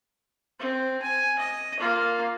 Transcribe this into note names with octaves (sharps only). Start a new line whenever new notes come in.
C4
G#5
D#5
A#3 F4